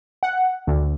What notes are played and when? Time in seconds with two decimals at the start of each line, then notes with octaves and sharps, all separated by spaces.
0.23 F#5
0.67 D2